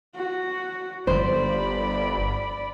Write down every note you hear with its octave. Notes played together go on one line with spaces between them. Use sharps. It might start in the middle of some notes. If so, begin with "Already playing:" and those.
F#4
G1 C5 D5 B5